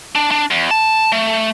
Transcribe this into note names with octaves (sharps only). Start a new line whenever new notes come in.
D4
D4
E2
A5
A3